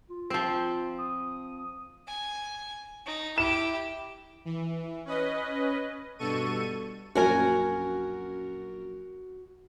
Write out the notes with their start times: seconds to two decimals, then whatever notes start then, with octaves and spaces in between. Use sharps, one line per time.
0.10 F4
0.30 F3 C4
0.99 D#6
2.08 G#5
3.06 D#4
3.38 E4 G4 E7
4.45 E3
5.05 C#4 B4 D#5
6.18 G2 B2 A4 C#6 D#7
7.15 A#1 F#2 F#4 A#4 G#5